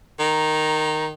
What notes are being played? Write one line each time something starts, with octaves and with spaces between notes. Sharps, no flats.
D#3 A#5